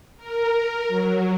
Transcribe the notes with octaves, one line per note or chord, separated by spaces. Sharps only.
A#4
F#3